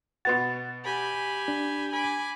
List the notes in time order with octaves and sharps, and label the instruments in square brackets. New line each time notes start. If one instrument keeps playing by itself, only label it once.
[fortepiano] B2 B3 F#4 [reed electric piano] A6
[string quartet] G4 G#5 B5
[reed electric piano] D4
[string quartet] G#5 B5 D6